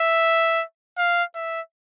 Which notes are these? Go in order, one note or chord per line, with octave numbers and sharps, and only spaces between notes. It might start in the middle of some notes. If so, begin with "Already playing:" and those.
Already playing: E5
F5
E5